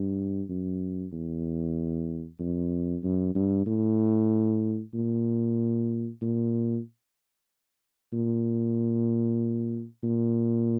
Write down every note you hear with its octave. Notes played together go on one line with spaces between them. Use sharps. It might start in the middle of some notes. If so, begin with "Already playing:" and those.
Already playing: G2
F#2
E2
F2
F#2
G2
A2
A#2
A#2
A#2
A#2